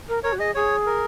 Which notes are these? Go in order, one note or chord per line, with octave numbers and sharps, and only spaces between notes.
A#4
A#4 C#5
F#4
G#4 D#5
G#4 C#5
A#4